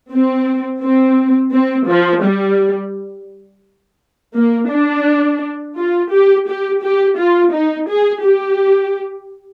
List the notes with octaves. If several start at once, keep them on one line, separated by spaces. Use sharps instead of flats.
C4
C4
C4
F3
G3
A#3
D4
F4
G4
G4
G4
F4
D#4
G#4
G4